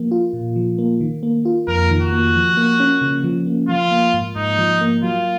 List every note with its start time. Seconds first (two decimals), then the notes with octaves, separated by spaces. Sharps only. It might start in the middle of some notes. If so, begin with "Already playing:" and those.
Already playing: F3 A#3
0.11 F4
0.33 A#2
0.56 F3
0.78 A#3
1.01 D#3
1.23 A#3
1.45 F4
1.68 F2 A#4
1.90 D#3
2.01 F#4
2.12 A#3
2.35 F3
2.57 A#3
2.80 C#4
3.02 C#3
3.24 F3
3.46 A#3
3.68 F3 F4
3.91 A#3
4.14 G#2
4.36 G#2 D#4
4.59 F3
4.81 A#3
5.03 F#3 F4